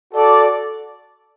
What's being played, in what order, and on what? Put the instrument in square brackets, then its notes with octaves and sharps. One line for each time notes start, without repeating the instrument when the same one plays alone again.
[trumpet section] F#4 A4 D5